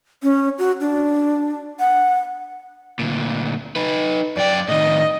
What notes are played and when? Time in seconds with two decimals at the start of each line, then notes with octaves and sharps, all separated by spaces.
0.23 C#4
0.59 F#4
0.81 D4
1.80 F#5
2.99 D2 A#2
3.76 D#4 B4
4.37 F#2 D5 G5
4.68 A2 D#3 D#5